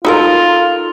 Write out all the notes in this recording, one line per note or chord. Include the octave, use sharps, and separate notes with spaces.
D#4 F4 A4 A#4